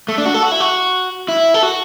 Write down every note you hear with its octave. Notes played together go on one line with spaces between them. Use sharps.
A3
D4
F#4
A4
F#4
E4
F#4
E4
A4
F#4